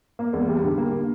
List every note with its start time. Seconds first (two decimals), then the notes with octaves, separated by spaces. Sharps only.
0.19 A#3
0.33 E2
0.48 G3
0.64 D3
0.78 A#3